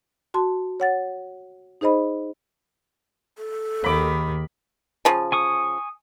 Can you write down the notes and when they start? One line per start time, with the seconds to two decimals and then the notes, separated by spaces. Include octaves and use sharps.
0.34 F#4 A5 C6
0.80 C#5 F#5 A6
1.81 D#4 G#4 C5 D#5 B5
3.38 A4
3.84 D#2 D#3 B5 D6
5.05 C#3 F3
5.32 G#5 C#6 D#6